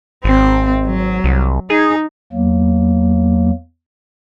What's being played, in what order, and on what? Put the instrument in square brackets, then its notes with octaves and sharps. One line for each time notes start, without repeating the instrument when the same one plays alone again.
[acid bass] G#1 [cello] C4
[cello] F#3
[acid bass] C2
[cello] D#4 [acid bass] G#4
[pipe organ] E2 F#3 A#3